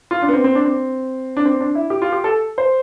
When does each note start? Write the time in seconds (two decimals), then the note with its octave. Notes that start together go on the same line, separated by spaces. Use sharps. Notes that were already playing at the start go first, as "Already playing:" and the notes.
0.11 F4
0.22 D4
0.28 B3
0.33 C4
0.44 C4
0.55 D4
0.65 C4
1.37 D4
1.45 C4
1.60 D4
1.75 E4
1.90 G4
2.02 F4
2.12 G4
2.24 A4
2.58 C5